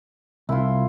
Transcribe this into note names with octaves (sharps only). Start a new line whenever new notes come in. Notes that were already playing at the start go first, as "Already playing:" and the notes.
C2 E4 F4